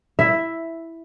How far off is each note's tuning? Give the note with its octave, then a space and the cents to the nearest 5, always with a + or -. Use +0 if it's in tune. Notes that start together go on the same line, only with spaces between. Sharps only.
E4 +0 E5 +5